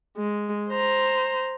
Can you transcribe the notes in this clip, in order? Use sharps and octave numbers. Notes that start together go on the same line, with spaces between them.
G#3
C5 A#5